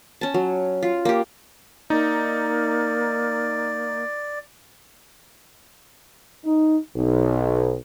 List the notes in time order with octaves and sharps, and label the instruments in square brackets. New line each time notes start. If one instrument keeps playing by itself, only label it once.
[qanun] C#4 A5
F#3
F4
A#3 G4
[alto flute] A#3 [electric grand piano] D#4 [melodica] D5
[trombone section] D#4
B1